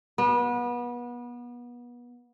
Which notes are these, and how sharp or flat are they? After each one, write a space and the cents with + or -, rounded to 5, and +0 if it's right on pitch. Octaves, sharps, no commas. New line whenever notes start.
B3 -30